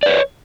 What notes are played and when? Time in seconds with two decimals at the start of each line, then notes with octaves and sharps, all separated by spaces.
0.03 D5
0.06 B4
0.09 C#5